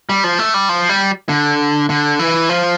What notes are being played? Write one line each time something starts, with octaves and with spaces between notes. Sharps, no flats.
G3
F3
A3
G3
F3
G3
D3
D3
E3
F3